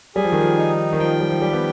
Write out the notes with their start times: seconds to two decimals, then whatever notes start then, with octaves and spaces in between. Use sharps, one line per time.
0.16 G3 G#4
0.24 F3
0.32 D#3
0.41 F3
0.57 D#4
0.93 D#3
0.99 F3 G5
1.20 G3
1.30 F3
1.41 G3 G4
1.53 B3